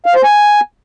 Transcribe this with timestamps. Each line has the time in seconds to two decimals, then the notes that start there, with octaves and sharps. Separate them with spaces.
0.06 F5
0.15 C5
0.24 G#5